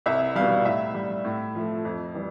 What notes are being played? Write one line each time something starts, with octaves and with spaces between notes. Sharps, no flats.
C2 E5
B2 G3 F5
A2 E5
G3
A2
F3 A3
F2
E3 G3